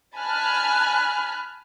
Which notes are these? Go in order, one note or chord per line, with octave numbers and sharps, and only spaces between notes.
G#5 A5 B5 F6 F#6